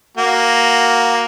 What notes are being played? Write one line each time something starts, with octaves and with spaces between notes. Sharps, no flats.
A#3 F#4